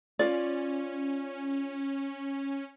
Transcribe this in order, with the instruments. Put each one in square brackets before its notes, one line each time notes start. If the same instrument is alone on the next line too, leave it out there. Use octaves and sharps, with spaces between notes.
[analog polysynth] C#4 [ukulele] F4 D5